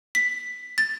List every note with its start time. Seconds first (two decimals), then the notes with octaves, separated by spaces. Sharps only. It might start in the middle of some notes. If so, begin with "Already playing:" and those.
0.15 B6
0.78 A6